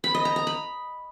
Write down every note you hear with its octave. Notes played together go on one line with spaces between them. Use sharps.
B5
D#5
A#5
A#5
B5